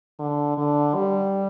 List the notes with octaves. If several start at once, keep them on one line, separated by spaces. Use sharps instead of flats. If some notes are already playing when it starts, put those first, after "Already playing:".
D3
D3
G3